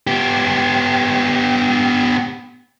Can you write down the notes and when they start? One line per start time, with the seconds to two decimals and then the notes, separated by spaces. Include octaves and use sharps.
0.07 B3 G4